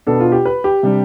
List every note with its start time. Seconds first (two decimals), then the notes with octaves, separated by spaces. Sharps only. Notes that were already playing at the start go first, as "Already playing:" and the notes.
0.07 B2 B3 D4 A4
0.20 F4
0.32 G4
0.45 B4
0.64 G4
0.83 C3 G3 D4